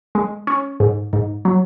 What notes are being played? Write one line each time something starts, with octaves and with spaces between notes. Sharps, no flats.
G#3
C#4
G#2
G#2
F#3